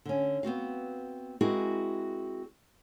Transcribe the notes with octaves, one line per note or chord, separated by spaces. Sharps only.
D3 C#4
B3 C4 F#4 F5
G#3 C4 E4 F#4 G#4 A#4